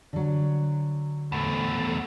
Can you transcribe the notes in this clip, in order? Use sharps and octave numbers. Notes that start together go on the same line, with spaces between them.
D3 F#3
E2 A3